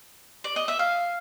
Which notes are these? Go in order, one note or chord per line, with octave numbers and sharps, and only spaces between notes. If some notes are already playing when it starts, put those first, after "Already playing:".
D5
D#5
E5
F5